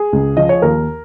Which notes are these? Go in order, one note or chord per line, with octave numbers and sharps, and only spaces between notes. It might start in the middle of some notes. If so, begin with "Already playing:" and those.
Already playing: G#4
C#2
F3 D#5
C#5
D#2 A#4